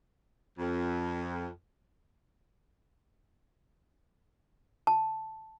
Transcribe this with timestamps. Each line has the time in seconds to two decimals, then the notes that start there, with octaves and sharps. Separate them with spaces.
0.59 F2
4.87 A5